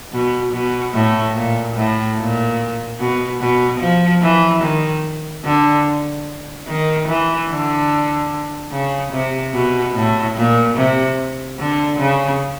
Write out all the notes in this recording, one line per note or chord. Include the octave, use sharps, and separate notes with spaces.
B2
B2
A2
A#2
A2
A#2
B2
B2
F3
E3
D#3
D3
D#3
E3
D3
C#3
C3
B2
A2
A#2
C3
D3
C#3